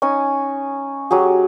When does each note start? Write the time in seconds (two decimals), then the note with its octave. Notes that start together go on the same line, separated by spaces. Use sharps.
0.02 C#4 D#4 G#5
1.11 F#3 G4 G#4